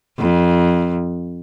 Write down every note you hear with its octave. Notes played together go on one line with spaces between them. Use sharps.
F2